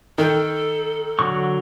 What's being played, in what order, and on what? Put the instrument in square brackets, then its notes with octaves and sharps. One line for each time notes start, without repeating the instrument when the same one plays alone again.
[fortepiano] D#3 G5 [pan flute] A4
[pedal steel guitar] D3 F#3 C#6